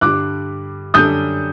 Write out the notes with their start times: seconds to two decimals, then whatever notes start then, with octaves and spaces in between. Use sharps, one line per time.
0.01 G2 D3 G3 D6 F#6
0.94 F#2 D3 G3 D4 A4 D#6 G6